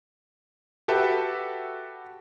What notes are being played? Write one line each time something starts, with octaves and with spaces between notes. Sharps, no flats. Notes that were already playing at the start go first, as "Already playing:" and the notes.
F#4 G4 A4 B4 E5